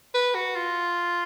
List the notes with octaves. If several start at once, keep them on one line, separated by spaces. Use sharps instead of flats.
B4
F#4
F4